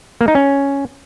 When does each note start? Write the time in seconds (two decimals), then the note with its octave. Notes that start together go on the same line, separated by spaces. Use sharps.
0.21 A#3
0.28 D#4
0.35 C#4